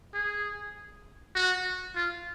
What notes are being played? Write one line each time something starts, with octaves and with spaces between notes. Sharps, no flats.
G#4
F#4
F4